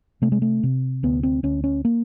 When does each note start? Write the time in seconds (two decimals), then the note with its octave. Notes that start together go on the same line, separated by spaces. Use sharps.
0.22 C3 A3
0.32 G#3
0.42 A3
0.63 C3
1.03 D2 B3
1.23 C4
1.43 D2 C#4
1.64 C#4
1.85 A#3